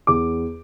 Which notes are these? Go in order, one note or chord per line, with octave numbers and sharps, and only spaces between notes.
E2 D6